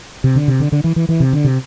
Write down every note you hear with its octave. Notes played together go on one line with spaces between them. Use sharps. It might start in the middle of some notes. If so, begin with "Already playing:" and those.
C3
D3
C3
D3
D3
E3
E3
E3
C3
D3
C3